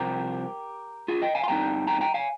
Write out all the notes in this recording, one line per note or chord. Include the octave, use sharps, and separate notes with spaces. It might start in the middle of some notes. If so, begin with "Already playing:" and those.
Already playing: C2 C3 F3 C4 G4 A#4
F4 G#4
D#5 G5
F5 G#5
C6
G2 G3 C4 D#4 G5 A#5
G5 A#5
G5 A#5
F5 G#5